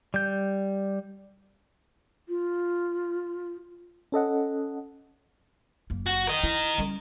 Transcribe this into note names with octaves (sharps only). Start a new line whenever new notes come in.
G3 G6
F4
C#4 A4 D#5 F#5
F#1 A#3
F#4
A#4 D#5
E4
G3 C#4